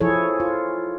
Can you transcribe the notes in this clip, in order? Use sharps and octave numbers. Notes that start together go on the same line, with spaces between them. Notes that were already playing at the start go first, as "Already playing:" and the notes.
F3 E4 G#4 A4 C#5
F4